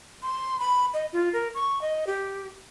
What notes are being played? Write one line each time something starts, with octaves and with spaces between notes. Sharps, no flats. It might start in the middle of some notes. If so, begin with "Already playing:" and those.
C6
B5
D#5
F4
A#4
C#6
D#5
G4